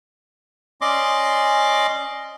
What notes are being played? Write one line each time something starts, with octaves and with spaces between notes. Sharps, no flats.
C#4 D5 D#5 C6 D6